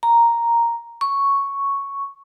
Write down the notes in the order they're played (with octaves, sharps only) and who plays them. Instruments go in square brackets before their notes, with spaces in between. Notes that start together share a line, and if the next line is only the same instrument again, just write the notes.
[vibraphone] A#5
C#6